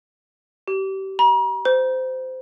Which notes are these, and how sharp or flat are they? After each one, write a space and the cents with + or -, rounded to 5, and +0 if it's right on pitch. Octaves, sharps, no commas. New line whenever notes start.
G4 -30
A#5 +40
C5 -20